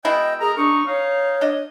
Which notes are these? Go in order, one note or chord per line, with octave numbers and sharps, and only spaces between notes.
B2 G#3 E4 D#5 G5
G#4 A#4 A#5
D4 D#4 C#6
D#4 C#5 F5
D4 D#5